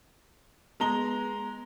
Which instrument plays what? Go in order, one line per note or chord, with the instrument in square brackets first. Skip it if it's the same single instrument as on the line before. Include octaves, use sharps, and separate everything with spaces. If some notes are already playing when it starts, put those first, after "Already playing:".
[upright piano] G#3 A#5 G7 [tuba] B3